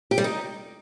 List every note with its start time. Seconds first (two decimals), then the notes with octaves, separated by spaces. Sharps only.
0.11 G4
0.18 G3
0.24 D#4